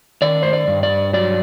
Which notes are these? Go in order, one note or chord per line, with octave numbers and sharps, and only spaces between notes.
D#3 D5
C5
D5
G2
D5
F#3 D5